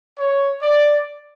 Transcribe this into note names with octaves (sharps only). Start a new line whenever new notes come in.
C#5
D5